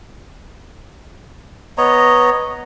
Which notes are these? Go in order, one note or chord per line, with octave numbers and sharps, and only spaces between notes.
B3 C#5 D#5 A#5